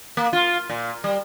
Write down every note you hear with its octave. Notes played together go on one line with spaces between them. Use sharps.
A#3
F4
A#2
G3